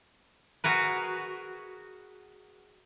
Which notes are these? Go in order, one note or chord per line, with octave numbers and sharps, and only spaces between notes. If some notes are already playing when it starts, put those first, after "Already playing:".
F#4 G#4 A#4 B4